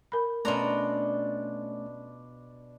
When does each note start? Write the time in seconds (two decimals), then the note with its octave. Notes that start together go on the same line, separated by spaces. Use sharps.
0.12 A#4 B5
0.45 B2 A3 C#4 D4 F4 A#5